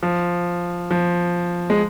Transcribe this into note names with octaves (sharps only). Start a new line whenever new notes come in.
F3
F3
G#3